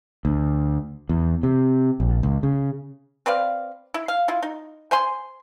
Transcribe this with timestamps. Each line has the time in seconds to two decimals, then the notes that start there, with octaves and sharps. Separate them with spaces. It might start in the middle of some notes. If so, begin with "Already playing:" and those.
0.25 D2
1.09 E2
1.43 C3
2.00 A#1
2.23 C#2
2.43 C#3
3.26 C4 B4 D5 F5
3.94 E4
4.08 F5
4.28 E4 F4
4.42 D#4
4.91 C5 G#5 C6